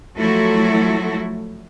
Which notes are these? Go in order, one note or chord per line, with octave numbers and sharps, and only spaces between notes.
F3 F#3 A3 E4 F#4 A4